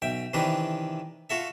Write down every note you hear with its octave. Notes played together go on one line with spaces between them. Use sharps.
B1 E5 G5
C3 D#3 E3 D4 B4
F4 F#4 A4 E5